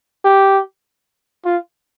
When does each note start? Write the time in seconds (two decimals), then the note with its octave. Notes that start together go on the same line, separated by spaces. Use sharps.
0.25 G4
1.45 F4